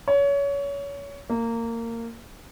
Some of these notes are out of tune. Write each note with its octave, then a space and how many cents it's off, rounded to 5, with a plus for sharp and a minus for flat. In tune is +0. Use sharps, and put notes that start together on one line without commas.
C#5 +25
A#3 -20